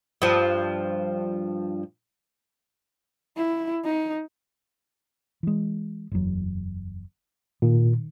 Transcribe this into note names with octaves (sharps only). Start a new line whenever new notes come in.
G2 F3
E4
D#4
E3 G#3
F#1 E2 F#3
A#2 D#3